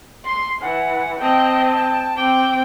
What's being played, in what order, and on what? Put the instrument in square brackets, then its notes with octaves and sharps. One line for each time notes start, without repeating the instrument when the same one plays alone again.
[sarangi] C6
[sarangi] E3 [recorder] F#5
[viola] C4 D#5 [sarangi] G5 [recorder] A5
[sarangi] G5
[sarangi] C4 [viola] G5 [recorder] D6